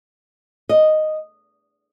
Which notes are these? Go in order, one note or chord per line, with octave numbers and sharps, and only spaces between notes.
D#5